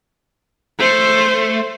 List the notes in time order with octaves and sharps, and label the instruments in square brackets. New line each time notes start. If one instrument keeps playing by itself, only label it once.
[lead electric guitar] A3 [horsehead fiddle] C5